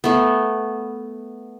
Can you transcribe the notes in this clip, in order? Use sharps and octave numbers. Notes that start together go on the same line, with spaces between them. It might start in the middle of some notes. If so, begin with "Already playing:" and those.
A3 B3